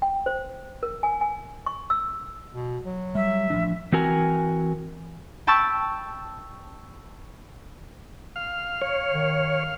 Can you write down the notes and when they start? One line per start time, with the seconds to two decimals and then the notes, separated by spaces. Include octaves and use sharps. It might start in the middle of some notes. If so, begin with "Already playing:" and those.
0.02 G5
0.26 C5
0.83 A#4
1.03 G#5
1.21 G#5
1.66 C#6
1.90 E6
2.53 B2
2.85 F#3
3.15 G3 E5
3.50 A1 F3 D4
3.92 E3 C4 F#4 A#4 G#5
5.47 G5 A5 B5 C#6 E6 A6
8.36 F5
8.82 C#5
9.14 D#3